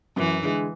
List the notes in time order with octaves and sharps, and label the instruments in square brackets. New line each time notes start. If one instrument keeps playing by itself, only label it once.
[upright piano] F#2 [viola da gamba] E3
[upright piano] D3 G#3